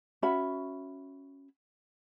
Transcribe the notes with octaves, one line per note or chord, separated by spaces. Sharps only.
C#4 F#4 E5 B5